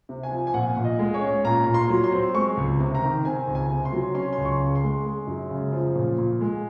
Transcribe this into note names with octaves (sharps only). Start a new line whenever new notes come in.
C3
G#5
F3
G#5
A#2 F#5
A#2
D#5
G#3
C#5
C#4
A#2 A#5
A#2 A#5
C6
F#3
C6
C4
G#3 C#6
C#2
C3
A#5
D#3
C4 G#5
C#2
G#5
C3
C6
F#3
C#4 C6
C#2 C6
C#6
C#3
C6
G#3
G#3
F#2
C#3
F3
A#2
A#2
G#3